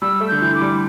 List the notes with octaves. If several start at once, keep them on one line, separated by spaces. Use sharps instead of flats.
G3 E6
A3
D3 G6
E3
D6
G3